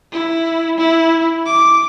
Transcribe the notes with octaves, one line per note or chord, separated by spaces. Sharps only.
E4
E4
D6